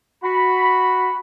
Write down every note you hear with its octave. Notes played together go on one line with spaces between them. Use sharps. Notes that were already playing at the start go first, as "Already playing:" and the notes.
F#4 B5